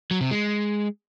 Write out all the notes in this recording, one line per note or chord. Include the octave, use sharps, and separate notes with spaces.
F#3
C3
G#3